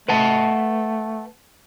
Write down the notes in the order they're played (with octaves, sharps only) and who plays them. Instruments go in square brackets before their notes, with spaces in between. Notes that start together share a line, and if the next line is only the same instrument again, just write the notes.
[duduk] A3 [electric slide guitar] B4 F#5 A5